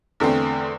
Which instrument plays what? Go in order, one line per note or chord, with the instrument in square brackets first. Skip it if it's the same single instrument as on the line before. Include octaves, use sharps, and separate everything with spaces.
[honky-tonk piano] E2 D3 A3 C4